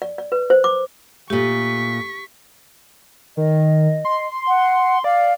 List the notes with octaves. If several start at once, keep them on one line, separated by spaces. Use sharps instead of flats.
D5
D5
B4
C5
D6
A#2 A3 G4 C#6 B6
D#3 D#5
C6
F#5
D5 F5